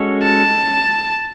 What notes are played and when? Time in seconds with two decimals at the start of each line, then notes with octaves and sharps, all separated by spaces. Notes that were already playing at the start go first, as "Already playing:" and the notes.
Already playing: G#3 C#4 F#4 A4 C#5
0.23 A5